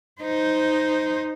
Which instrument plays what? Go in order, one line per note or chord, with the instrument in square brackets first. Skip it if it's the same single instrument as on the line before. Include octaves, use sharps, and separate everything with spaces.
[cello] D#4 C5